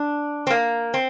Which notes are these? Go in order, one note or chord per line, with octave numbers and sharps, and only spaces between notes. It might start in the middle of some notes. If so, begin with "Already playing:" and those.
Already playing: D4
C4
A#3
C4